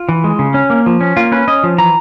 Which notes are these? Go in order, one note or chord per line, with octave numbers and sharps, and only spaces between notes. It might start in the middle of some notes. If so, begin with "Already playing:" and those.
Already playing: F4
E3
G#3
C#3
C#4
A#3
F3
C#4
A#3 F4
C#4 B4
C#4 D#5
F3
E3 A#5